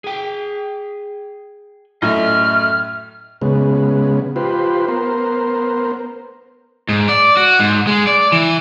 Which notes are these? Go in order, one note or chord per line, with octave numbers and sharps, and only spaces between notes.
G#4 G5
F#2 A2 D#5 E5 F6
C#3 G#3 B3
F4 G4 B4 C5
B3 A#4 C5
G#2
D5
F#4
G#2
G#3
D5
E3